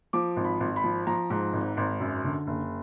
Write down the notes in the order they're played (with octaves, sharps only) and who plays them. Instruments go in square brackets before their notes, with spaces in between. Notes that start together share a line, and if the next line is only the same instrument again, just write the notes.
[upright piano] F3 D6
G#1
B5
G#1
B5
F3
F3 A#5
G#2
G#1
G#1
F#2
D3
F#1